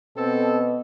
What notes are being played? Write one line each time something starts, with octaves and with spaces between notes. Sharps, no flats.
B2 C4 A4